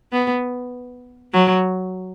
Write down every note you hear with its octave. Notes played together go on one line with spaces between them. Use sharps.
B3
F#3